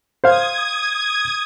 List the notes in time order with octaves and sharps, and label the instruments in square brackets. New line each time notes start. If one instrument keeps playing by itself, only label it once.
[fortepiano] C5 F5 [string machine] D#6 G#6